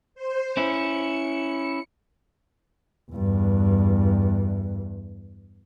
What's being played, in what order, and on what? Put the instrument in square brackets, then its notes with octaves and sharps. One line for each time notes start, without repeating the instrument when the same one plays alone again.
[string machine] C5
[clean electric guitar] C#4 E4 [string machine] C#7
[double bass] E2 G2